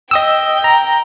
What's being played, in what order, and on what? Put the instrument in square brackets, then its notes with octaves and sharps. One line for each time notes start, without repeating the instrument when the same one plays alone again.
[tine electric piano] D#5 D#6 E6 [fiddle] G5
[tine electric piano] A#5